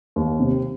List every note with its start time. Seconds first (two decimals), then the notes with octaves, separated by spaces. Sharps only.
0.16 D#2
0.40 C3